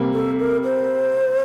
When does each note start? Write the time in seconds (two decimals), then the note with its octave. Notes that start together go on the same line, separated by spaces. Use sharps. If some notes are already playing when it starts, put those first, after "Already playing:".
Already playing: C3 G3 A#3
0.14 A4
0.39 A#4
0.64 C5